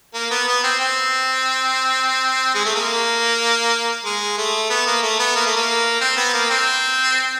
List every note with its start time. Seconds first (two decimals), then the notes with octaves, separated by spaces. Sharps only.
0.14 A#3
0.31 B3
0.48 B3
0.64 C4
0.80 C4
2.55 G#3
2.65 A3
2.75 A#3
4.05 G#3
4.38 A3
4.70 B3
4.87 A#3
5.03 A3
5.19 B3
5.35 A#3
5.46 A3
5.56 A#3
6.01 C4
6.17 B3
6.34 A#3
6.50 C4